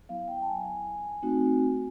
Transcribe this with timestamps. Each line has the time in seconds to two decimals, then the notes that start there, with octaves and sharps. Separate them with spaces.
0.09 F#3 B3 E4 F5
0.28 G5
0.42 A5
0.47 G#5
1.23 A3 C4 D#4 F#4